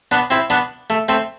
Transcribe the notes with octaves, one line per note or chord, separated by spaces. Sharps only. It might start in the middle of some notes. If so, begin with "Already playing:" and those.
B3 D4
C4 E4
B3 D4
A3
A3 C4